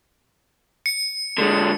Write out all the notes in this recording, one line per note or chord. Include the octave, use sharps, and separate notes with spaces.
C#7
D3 G#3